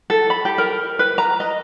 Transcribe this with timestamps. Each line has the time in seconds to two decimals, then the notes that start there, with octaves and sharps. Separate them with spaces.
0.10 A4
0.30 B5
0.45 G4
0.58 A#4
0.99 B4
1.18 A#5
1.40 D#5